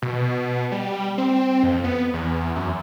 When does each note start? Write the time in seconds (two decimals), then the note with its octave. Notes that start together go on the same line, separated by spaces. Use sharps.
0.02 B2
0.72 G3
1.18 C4
1.63 F2
1.84 B3
2.13 E2
2.56 F#2